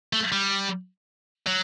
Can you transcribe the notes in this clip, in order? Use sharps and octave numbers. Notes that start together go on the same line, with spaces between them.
A3
G3
F#3